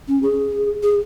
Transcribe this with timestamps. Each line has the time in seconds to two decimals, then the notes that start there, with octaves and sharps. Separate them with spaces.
0.08 C#4
0.23 G#4
0.83 G#4